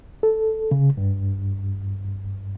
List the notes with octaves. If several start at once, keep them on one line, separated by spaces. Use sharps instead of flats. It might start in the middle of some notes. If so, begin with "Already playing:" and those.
A4
C#3
G2